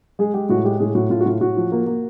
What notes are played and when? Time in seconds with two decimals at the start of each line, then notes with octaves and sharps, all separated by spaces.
0.19 G#3 G#4
0.34 G#3 G4
0.49 A2 F#4
0.64 G#3 G4
0.80 A2 G#4
0.95 A2 F#4
1.10 A2 F4
1.21 F#4
1.26 A2 F4
1.41 A2 F#4
1.57 F3
1.72 A#3
1.86 A#3